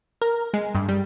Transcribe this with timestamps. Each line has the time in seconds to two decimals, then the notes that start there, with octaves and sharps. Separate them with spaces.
0.22 A#4
0.54 G#3
0.75 G2
0.89 G3